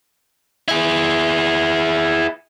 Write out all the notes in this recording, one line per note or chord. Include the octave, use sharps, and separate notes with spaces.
E4 G#4